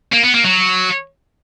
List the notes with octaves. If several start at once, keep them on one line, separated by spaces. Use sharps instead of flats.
A#3
B3
A#3
F#3